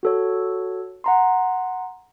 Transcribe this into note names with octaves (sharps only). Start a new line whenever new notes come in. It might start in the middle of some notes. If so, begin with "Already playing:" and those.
F#4 A4 C#5
F#5 A#5 C6